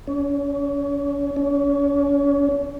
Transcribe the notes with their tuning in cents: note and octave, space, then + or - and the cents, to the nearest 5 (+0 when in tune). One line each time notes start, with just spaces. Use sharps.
C#4 +40
C#4 +40